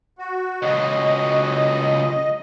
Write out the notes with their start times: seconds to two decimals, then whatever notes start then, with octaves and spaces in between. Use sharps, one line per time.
0.19 F#4
0.62 C#2 F#3 D#5